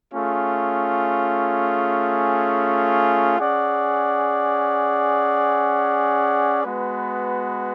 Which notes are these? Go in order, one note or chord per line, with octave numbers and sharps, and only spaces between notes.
A3 C#4 F4 G#4
C#4 G#4 D5 F#5
G#3 B3 F#4 B4